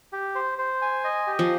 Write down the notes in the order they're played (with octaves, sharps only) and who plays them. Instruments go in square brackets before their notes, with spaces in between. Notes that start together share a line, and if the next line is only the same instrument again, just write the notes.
[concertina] G4
C5
C5
G#5
D#5
G4
[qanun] F3